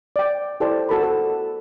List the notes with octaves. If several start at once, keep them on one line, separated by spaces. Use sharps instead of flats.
D5 G5
E4 G4 A4 C5 D5 A5
F#4 A4 A#4 B5
A4